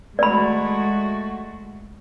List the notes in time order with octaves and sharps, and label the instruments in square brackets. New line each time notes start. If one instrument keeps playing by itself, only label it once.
[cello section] G#3 A3 F#4 [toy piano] D5 B5